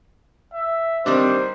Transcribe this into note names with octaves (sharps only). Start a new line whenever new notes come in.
E5
D#3 G3 C4 D4 C5